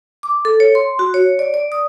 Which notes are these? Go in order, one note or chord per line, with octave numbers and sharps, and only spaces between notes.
D6
A4
C#5
C6
F#4
C#5
D5
D5
D#6